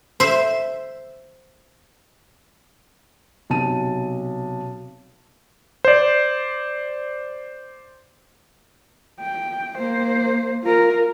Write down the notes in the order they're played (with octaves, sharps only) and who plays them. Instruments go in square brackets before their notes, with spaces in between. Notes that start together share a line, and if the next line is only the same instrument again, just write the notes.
[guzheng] C5 E5
[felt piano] B1 C3 A5 D#7
[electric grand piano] C5 D5
[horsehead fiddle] G5
A#3 C5
F4 A#4